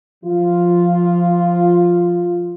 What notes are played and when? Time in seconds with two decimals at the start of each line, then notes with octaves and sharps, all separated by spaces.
0.24 F3 F4